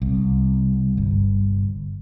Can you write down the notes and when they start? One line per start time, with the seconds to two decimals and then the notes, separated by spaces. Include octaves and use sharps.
0.02 C2
0.97 G1